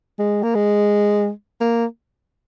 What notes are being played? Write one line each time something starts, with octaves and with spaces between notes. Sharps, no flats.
G#3
A#3
G#3
A#3